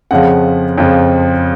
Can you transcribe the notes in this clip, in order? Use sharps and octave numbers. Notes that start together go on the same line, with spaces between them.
F2 C#3 F3 F#5
F2 C#3 F3